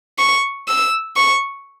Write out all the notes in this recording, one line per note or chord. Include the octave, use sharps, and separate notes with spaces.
C#6
E6
C#6